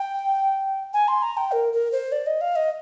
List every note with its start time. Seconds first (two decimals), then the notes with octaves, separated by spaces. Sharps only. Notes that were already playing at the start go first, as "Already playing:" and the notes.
Already playing: G5
0.93 G#5
1.08 C6
1.22 A#5
1.37 G5
1.52 A#4
1.73 A#4
1.92 C5
2.12 D5
2.27 D#5
2.41 F5
2.56 D#5